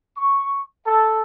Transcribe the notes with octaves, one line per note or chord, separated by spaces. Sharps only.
C#6
A4